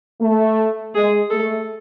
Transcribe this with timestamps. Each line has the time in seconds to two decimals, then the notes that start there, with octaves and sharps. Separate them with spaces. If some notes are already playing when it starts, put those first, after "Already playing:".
0.21 A3
0.94 G#3 G#4
1.31 A3 A4